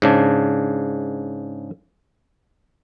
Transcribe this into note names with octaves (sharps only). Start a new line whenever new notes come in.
G#2 C#3 D4